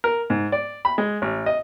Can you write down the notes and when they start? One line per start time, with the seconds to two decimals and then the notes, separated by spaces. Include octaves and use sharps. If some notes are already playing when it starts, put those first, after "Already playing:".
0.04 A#4
0.30 G#2
0.52 D5
0.85 B5
0.98 G#3
1.22 A1
1.46 D#5